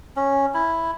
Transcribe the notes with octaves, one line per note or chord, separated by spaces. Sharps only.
C#4
E4